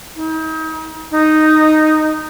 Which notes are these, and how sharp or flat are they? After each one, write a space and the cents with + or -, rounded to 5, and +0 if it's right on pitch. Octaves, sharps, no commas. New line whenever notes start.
D#4 +35
D#4 -5